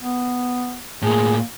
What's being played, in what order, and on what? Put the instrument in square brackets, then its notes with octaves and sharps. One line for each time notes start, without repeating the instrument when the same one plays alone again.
[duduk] B3
[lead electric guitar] A2 A#3 [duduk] G#4